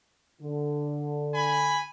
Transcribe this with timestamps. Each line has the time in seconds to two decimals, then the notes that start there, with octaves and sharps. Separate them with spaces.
0.41 D3
1.34 G#5 B5